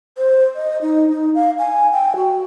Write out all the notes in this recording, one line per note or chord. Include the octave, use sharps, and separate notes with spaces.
C5
D#5
D#4
D#4
F5
G#5
G5
F#4